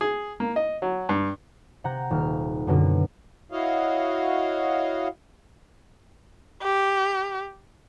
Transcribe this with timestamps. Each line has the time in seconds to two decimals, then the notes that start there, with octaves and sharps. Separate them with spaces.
0.01 G#4
0.40 A#3
0.56 D#5
0.82 F#3
1.09 G2
1.84 C3 F#5 A#5 G6
2.11 D#1 F6
2.67 F#2 B2 D3
3.52 E4 F#4 C#5 D#5 F5
6.63 G4